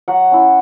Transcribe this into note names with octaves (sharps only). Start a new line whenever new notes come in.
F#3 F#5
C#4 E4